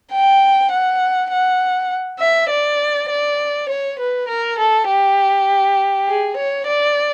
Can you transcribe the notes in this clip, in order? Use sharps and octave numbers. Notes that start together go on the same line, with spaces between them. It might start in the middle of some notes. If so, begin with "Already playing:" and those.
G5
F#5
F#5
E5
D5
D5
C#5
B4
A#4
A4
G4
G#4
C#5
D5